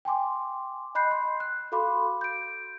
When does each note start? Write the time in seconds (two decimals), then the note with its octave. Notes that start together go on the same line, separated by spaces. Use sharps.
0.05 G5 G#5 C6 D6
0.95 D#5 B5 F#6 G6 C7
1.11 C6
1.40 F#6
1.72 F#4 A4 F5 B5 C6 D6
2.21 G6 D7